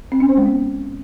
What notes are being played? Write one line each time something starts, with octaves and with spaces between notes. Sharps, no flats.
C4
C#4
C5
G#3
B3